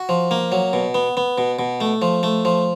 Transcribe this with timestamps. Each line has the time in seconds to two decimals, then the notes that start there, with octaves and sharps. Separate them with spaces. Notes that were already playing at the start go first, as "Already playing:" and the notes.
Already playing: F#4
0.09 F3
0.31 A#3
0.52 F#3
0.73 B2
0.95 B3
1.17 B3
1.38 B2
1.59 B2
1.81 A3
2.02 F3
2.23 A3
2.45 F3